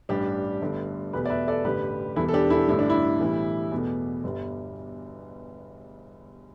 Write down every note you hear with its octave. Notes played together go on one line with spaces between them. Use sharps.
A1 G2 G3 D4 G4
G1 G2 D3 A3
E2 B2 A3 G4 B4
D5
B4 E5
A4 D5
A1 G2 D3 G3 G4 B4
E1 E2 E3 G3 E4 A4
A4
D4 G4
E4 A4
A1 G2 D3 A3 E4
D4
E4
B1 A2 E3 G3
E2 B2 A3
G1 G2 G3